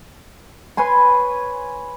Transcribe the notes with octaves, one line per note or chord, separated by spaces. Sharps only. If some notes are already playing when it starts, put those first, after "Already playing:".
B4 C#5 G#5 C6